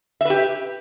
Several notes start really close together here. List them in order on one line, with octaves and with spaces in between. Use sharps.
E5 B4 G4